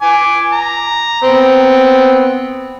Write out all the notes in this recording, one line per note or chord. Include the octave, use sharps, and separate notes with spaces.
G#5 D6
A#5
B3 C4